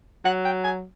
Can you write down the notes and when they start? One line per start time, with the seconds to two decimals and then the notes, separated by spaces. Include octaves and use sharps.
0.25 F#3 F#5
0.45 G5
0.64 G#5